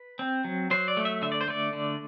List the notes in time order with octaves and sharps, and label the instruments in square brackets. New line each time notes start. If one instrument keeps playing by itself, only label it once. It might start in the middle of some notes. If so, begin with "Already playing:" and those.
Already playing: [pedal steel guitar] B4
C4
F#3
F#3 C5
D5
A3
E5
D3 E5
D5
C5
A3 D5
D3